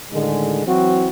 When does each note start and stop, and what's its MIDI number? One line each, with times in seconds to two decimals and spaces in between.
0.12 0.64 45
0.12 0.64 50
0.12 0.64 51
0.12 0.64 56
0.66 1.08 52
0.66 1.08 54
0.66 1.08 60
0.66 1.08 64
0.66 1.08 66